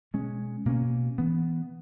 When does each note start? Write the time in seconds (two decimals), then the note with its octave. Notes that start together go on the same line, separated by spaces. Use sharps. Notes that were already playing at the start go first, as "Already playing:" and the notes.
0.14 B2 G#3 C#4
0.66 B2 A#3 C#4
1.18 E3 B3